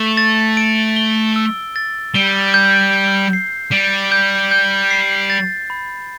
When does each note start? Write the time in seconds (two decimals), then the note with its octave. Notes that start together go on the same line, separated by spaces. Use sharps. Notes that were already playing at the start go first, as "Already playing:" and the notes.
Already playing: A3
0.17 A6
0.57 D7
0.96 G7
1.36 E6
1.76 A6
2.14 G3 G7
2.54 G6
2.93 G6
3.33 C7
3.72 G3 G7
4.12 G6
4.51 G6
4.91 C7
5.30 A6
5.70 B5